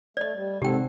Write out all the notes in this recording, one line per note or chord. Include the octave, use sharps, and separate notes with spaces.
A3 D5 D#5
G3
G#1 C3 C4 G4 A4 F#5 G5